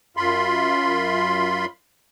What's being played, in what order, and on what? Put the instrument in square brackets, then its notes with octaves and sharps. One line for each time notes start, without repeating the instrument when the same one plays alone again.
[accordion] F#2 F4 B5 C6